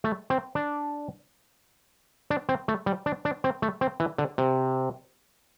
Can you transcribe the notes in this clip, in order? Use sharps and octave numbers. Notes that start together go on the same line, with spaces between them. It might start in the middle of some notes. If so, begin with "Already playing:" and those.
A3
C4
D4
D4
C4
A3
G3
D4
D4
C4
A3
C4
E3
D3
C3